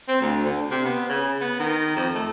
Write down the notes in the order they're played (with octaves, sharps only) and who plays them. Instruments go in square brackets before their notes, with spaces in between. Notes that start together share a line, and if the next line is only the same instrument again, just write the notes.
[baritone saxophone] C4
D2
D3
C3
B3
C#3
B3
D#3
F2
A3